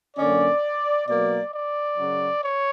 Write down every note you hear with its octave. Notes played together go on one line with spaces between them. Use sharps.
F#2 D3 A#3 C#4 D5
B2 F#3 A#3 D5
D5
F#2 C#3 F#3
C#5